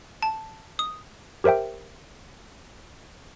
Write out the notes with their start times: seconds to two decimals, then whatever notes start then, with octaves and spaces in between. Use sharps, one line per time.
0.23 A5
0.79 D#6
1.44 G4 A#4 C5 E5 G5